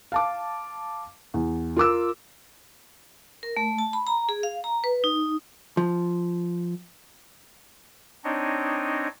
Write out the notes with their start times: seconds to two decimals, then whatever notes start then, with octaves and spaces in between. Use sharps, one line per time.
0.12 F5 A5 D6
1.34 E2
1.76 F4 A#4 D6 E6
3.43 A#4
3.57 A3
3.78 A5
3.93 B5
4.07 A#5
4.29 G#4
4.43 F5
4.64 A#5
4.84 B4
5.04 D#4
5.77 F3
8.24 C4 D4 D#4 C#5 D#5